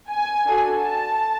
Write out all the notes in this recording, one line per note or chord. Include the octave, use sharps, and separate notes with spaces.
G#5
D4 F#4 A4
A5